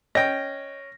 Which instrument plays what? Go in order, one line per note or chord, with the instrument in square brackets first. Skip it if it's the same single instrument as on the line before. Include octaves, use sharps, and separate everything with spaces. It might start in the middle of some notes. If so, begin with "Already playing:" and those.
[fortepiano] C#4 G5 [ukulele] D#5 [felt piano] A#6